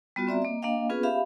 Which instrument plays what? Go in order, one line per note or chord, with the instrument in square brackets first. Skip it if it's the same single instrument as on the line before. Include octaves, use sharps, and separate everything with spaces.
[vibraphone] G3 B3 F4 F#4
C4 D5 E5 A#5
A#3 D#5
A#3 D4 D#5 F5 G5
B3 C#4 F4 G#4 B4
G4 E5 F5 B5